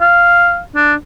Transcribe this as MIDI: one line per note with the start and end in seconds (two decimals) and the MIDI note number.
0.01 0.60 77
0.75 0.94 62